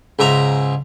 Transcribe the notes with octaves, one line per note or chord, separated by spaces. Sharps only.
C#2 G#2 E5 A#5